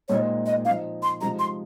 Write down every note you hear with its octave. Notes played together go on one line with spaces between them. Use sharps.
A#2 G#3 C4 D#4 C#5
D#5
F3 C4 D#4 F5
C6
C3 F3 G#3 D#4 A#5
C6